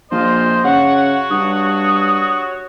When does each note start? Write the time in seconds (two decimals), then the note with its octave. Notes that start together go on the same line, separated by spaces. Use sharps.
0.12 A#1 F4 C5 D#5
0.64 C#3 F#4 C#5 F#5
1.31 G2 D#6